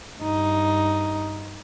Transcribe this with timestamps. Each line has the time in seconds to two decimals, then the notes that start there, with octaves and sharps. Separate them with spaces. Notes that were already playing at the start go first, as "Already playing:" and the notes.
0.22 G2 D#4